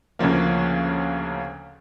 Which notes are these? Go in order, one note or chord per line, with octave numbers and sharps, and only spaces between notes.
D2 C#3 F3 A#3